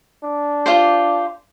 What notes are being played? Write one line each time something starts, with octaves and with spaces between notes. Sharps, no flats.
D4
F4 G4 C5